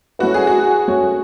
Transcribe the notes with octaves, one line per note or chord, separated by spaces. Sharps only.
A3 C#4 E4 F#4 B4
G#4
F#4
A3 C#4 F#4 C#5